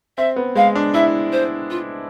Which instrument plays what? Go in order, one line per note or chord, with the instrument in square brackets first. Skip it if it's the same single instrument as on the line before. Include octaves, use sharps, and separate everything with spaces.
[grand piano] C4 [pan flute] E5
[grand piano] B3
[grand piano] G#3 [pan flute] F5
[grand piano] D4
[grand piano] E4 [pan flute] E5
[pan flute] C5
F4